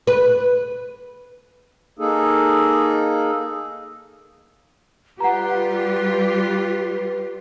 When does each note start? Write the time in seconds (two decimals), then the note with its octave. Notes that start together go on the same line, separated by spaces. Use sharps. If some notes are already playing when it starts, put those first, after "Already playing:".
0.07 B4
1.99 A#3 D#4 G#4 A4
5.21 G3 F4 G4 B4 F#5 A#5